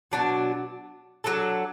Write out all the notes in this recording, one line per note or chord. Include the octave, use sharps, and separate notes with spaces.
B2 F#3 D4 F#4
F#3 D4 A4